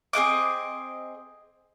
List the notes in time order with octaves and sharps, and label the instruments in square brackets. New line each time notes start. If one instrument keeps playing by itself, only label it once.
[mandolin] C4 G#4 D#5 D6